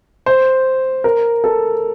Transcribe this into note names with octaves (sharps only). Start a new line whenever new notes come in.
C5
A#4
A4